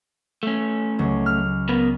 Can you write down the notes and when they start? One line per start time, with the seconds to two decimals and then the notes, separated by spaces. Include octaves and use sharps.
0.43 A3 C#4
0.99 C#2 F#3
1.26 F6
1.69 B3 A#4 B4